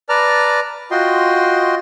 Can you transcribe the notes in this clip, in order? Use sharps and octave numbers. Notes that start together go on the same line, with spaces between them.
B4 D5 A5 A#5 F6
F4 F#4 D#5 G5 C6